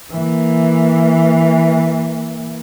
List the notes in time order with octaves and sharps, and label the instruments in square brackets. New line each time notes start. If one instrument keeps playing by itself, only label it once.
[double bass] E3 A#3